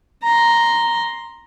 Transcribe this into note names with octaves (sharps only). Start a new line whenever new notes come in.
A#5 C6